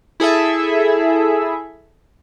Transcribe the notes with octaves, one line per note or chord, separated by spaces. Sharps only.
E4 G#4 A4 E5